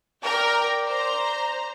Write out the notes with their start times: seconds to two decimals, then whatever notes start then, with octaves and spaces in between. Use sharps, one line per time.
0.24 A#4 D5 G5 A#5
0.86 C5 A#5